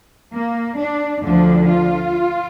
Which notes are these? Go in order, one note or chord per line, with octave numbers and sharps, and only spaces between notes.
A#3
D4
D2 D3 F3 D4
F4